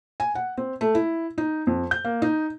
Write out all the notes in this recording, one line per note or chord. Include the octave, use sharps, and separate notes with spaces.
G#5
F#5
C4
A3
E4
D#4
F2
G6
A#3
D#4